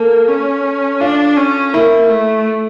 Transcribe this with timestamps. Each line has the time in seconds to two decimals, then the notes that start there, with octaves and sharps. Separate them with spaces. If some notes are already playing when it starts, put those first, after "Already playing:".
Already playing: A#3 A4
0.28 C#4
1.01 D4 F4
1.37 C#4
1.73 A#3 E4
2.10 A3